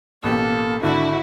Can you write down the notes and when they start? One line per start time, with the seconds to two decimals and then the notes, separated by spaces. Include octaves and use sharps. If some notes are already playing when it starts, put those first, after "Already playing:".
0.24 A1 B2 A#3 G4 A4
0.83 G#1 D3 D4 E4 F#4